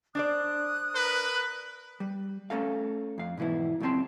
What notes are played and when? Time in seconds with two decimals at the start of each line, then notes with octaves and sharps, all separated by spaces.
0.15 D4 C5 D5 D#6 F#6
0.95 A#4 B4
2.00 G3
2.50 A3 C#4 A4 F5
3.18 F2 F5
3.37 G#2 B2 E3 B3 E4
3.80 C#2 F#2 C#3 C4 A5 C6